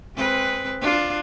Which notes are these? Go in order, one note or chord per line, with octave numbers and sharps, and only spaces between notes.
G#3 C4 B4
D4 F4